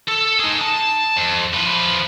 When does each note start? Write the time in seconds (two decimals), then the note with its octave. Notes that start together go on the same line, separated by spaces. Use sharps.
0.08 A4
0.40 D#4 G#4
0.61 A5
1.16 F2
1.54 F3 B4